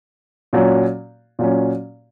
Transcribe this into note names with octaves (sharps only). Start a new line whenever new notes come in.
A#2 F#3 C#4
A#2 F#3 C#4